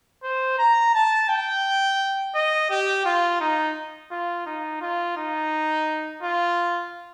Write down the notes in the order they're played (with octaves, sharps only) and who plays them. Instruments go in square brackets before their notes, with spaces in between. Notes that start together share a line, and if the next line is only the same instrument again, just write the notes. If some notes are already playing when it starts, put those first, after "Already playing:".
[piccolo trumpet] C5
A#5
A5
G5
D#5
G4
F4
D#4
F4
D#4
F4
D#4
F4